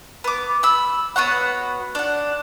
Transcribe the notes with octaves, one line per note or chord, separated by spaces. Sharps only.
B3 D6
B5 E6
B3 F#4 C#5 F#5
D4 F#5